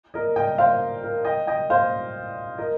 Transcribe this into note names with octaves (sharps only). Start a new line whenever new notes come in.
A#4 D#5
D#5 G5
C5 F5
A#4
D#5 G5
D#5 G5
C5 F5
A#4 D#5